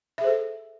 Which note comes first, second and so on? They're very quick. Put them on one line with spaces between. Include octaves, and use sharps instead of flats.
E5 G#4 C5 A4